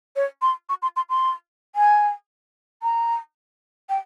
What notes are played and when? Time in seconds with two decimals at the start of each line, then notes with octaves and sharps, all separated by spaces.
0.16 C#5
0.42 C6
0.69 C#6
0.82 C6
0.96 C6
1.10 C6
1.75 G#5
2.83 A#5
3.89 G5